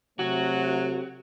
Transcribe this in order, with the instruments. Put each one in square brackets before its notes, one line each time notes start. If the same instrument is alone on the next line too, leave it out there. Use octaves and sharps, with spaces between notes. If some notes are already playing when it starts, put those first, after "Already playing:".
[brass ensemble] C3 A3 [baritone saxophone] F#3 [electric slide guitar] F#4